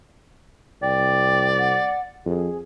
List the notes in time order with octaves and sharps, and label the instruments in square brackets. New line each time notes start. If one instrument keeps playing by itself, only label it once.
[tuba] C2 [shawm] D5 [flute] G5
[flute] F#5
[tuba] F2 [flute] G#4